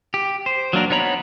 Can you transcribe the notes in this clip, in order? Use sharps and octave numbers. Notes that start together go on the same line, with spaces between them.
G4
C5
F#3 A#3 D4 A#4
B3 D#4 C#5 A#5 B5